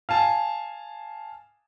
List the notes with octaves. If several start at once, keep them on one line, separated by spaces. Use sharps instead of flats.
F5 G#5 A5